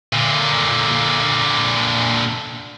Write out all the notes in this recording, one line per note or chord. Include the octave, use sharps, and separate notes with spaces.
A#2 D3